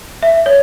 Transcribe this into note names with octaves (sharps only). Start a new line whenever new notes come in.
E5
C#5